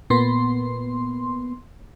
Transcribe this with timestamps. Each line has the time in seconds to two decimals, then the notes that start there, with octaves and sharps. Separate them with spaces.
0.10 A#2 B3 C6